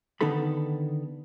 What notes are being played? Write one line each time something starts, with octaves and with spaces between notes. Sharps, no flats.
D3 D#3 B3 D#4 A4 B5